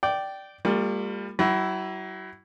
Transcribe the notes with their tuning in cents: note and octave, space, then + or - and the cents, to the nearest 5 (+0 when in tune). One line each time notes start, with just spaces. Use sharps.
D5 +0 G5 -15
G3 +30 A#3 -35 F4 +25
F#3 +40 E4 +0